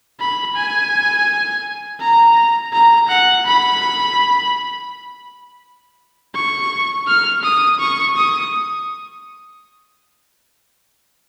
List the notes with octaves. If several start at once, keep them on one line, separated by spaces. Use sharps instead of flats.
B5
G#5
A#5
A#5
F#5
B5
C#6
F6
D#6
C#6
D#6